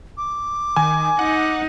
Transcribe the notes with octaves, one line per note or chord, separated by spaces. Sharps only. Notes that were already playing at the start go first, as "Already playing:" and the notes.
D6
D#3 G#5
D#4 F#5